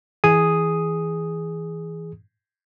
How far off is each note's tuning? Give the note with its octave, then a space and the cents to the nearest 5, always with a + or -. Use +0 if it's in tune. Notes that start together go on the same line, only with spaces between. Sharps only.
E3 -15 G#4 +0 D#6 +0